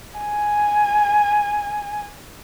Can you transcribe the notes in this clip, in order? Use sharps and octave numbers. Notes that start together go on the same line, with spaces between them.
G#5